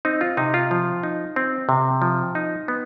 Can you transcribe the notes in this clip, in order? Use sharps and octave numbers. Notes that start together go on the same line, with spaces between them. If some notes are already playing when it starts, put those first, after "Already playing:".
C4 D#4
F4
C3 D#4
F4
F3
D#4
C4
C3
F3
D#4
B3